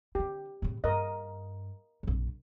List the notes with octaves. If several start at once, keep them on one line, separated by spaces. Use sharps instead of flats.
D3 E3 G4
A2 C#3
G2 A#4 D#5
A#1 F#2